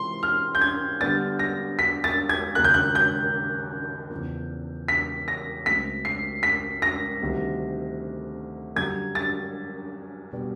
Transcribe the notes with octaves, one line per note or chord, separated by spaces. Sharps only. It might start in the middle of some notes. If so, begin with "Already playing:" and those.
Already playing: C3 E3 G#3 C4 F4 C6
F6
G6
G#6
D3 G3 B3 D4 A6
A#6
B6
A6
G#6
D#2 C#3 F#3 A#3 F#6
G6
F#6
G6
E2 C#3 F3
B6
A#6
C#2 C#3 F#3 A3 C4 B6
C7
B6
A#6
D2 C3 D#3 G3 C4
F#2 D3 G3 A#3 G#6
A6
B2 G3 B3 D4